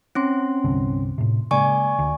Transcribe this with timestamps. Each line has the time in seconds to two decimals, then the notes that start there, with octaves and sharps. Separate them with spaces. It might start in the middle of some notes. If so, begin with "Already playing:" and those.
0.15 C4 C#4 C6
0.64 C2 G2 D3
1.18 A2 C3
1.51 C#3 G#3 A#3 D5 G#5 C#6
1.99 D2